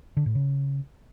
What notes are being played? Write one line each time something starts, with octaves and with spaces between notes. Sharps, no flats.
D3
A2
C#3